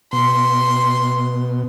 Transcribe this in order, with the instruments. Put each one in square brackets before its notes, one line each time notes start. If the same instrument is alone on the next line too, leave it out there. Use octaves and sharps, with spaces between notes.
[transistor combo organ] B2 [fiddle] C6